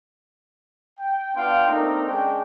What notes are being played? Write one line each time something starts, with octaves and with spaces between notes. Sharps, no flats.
G5
B3 D4 F4 F5 G5 C6
A3 A#3 C4 D4 D#4 A#4
G#3 C#4 D4 G#4 G5